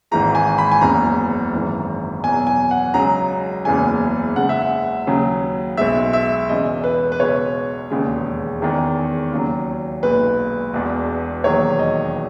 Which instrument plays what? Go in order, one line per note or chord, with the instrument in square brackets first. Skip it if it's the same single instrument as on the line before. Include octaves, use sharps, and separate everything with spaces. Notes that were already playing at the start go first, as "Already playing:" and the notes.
[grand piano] G#1 G#2 E3 G#3 A#5
G#5
B5
G#5
F#1 E2 C#3 A#5
G#1 F#2 E3 G#3
E2 B2 F#3 G#5
G#5
F#5
C#2 C#3 F#3 A#5
F#1 E2 C#3 E3 G#3 G#5
C#2 C#3 G#3 F#5
E5
F#5
D#2 C#3 F#3
B1 B2 G#3 E5
E5
E1 E2 C#3 D#5
B4
B4
C#2 B2 G#3 C#5
E1 D#2 C#3 G#3
E2 D#3 G#3
D#2 C#3 F#3
B1 A#2 G#3 B4
E1 E2 B2
E1 D#2 D#3 F#3 C#5
D#5